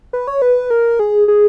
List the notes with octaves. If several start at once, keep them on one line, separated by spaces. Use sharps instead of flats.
B4
C#5
B4
A#4
G#4
G#4